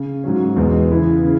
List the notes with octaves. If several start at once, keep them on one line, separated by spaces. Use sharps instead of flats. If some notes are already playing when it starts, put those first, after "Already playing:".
Already playing: C#3
G#2 F#3 C#4
E2 B2 G#3
C#3 E3 B3 E4
C#3